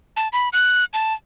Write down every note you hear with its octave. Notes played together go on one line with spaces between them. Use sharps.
A5
B5
F#6
A5